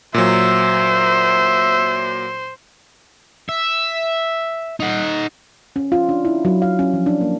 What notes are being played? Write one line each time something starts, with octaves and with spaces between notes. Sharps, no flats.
A#2 F#3 C5 E5
E5
D#4 F#5
C#4
F4
D4
E4
F#3
F5
C#4
F3
D4
A#3